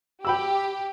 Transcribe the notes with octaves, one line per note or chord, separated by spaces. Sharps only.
G4 G5 B5 E6